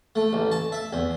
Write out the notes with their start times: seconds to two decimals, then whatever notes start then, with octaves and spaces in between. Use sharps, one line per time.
0.15 A3
0.33 A1
0.52 A5
0.72 E5
0.93 E2